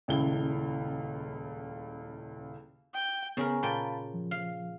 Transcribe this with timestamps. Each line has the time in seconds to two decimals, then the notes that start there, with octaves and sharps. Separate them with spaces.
0.08 D#1 C#2 E4 G7
2.94 G5
3.37 C#3 B3 G#4 A#4
3.63 A#2 F5 G5 A5 B5
4.14 F3
4.31 F5